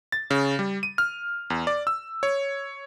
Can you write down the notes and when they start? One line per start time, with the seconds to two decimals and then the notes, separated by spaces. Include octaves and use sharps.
0.12 A6
0.30 C#3
0.59 G3
0.83 D#7
0.98 F6
1.50 E2
1.67 D5
1.87 E6
2.23 C#5